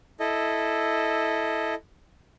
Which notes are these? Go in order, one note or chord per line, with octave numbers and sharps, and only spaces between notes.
E4 A4 D#5